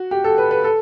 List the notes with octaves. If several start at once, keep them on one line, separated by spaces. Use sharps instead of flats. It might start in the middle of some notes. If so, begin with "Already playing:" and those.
Already playing: F#4
G4
A4
B4
B4
A4